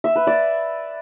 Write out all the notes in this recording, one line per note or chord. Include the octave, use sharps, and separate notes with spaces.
E5
B4
D5